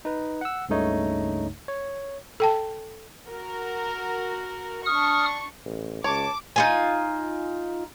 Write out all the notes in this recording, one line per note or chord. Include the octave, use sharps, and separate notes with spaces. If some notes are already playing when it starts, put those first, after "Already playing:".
D#4 B4
F#5 E6
C#2 G2 C#3 A3 D#4 C#5
C#5
A4 G5 A5
F#4 A#4
D4 C#6 D#6 F6
A1
C#2 C#5 A5 D6
D#4 F4 G#5